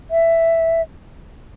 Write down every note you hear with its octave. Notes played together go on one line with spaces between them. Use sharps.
E5